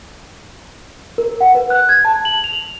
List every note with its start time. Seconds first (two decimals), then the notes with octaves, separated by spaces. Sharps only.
1.18 A#4
1.41 F#5
1.55 B4
1.70 F#6
1.89 G#6
2.05 A5
2.25 F#7
2.44 F7